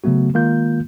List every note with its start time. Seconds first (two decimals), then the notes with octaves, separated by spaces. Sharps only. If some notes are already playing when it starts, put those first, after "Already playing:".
0.04 C#3 F#3 A3 B3 F#4
0.34 D#3 G#3 A#3 F4 G6